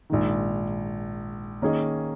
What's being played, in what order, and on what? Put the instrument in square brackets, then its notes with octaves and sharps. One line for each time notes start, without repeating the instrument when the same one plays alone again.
[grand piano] A#1 G#2 D#3
D#3 A#3 C#4 G#4 D#5